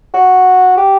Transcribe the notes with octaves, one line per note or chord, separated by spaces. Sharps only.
F#4
G4